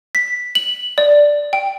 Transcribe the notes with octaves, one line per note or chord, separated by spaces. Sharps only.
B6
F#7
D5
G5